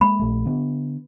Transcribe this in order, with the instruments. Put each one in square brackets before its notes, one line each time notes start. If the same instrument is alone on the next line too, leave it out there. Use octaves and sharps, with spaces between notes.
[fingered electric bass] G#3 A#3 [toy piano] B5
[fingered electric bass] A#1 A3
D3 B3